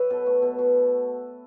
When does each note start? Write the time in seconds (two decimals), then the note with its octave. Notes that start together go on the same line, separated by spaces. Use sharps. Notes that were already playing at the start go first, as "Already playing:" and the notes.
Already playing: F#3 B4 E5
0.10 B2 A4
0.26 A3
0.42 B2
0.59 B2